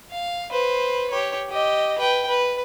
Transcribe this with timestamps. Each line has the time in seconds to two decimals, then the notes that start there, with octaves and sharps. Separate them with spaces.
0.11 F5
0.51 B4 C5
1.11 G4 C#5
1.50 G4 D#5
1.99 B4 G5
2.28 B4